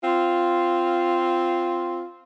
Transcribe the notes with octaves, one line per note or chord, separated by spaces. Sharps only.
C4 F4